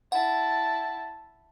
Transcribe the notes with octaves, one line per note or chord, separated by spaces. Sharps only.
E4 F#5 A5